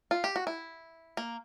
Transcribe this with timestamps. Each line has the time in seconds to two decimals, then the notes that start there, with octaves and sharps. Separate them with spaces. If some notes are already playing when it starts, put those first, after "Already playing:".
0.11 F4
0.24 G4
0.36 F#4
0.47 E4
1.17 A#3